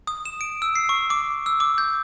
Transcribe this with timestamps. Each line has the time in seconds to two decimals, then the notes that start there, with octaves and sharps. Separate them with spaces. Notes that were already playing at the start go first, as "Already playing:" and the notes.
0.07 D#6
0.25 E7
0.41 D7
0.62 E6
0.76 C7
0.89 C#6
1.10 D6
1.46 E6
1.60 D6
1.78 G6